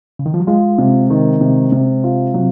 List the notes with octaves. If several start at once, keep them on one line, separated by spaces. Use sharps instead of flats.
C#3
D#3
F3
F#3
G#3 F4
C3
D#3
C3
C3
F4
C3 F#3